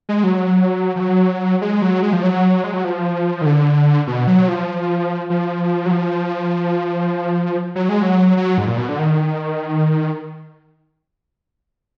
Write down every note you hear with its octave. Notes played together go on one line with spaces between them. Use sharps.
G#3
F#3
F3
F#3
G#3
F#3
G#3
F3
F#3
G#3
F#3
F3
D#3
D3
B2
F#3
F3
F3
F#3
F3
F#3
G#3
F#3
F#3
G#2
A#2
B2
D3
D#3